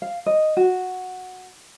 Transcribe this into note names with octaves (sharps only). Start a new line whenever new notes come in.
F5
D#5
F#4